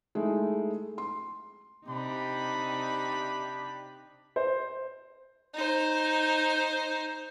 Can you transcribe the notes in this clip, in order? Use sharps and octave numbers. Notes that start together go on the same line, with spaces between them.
G#3 A3 D#4 E4
C6
C3 D4 D#4 G4 B5
C5
D#4 C5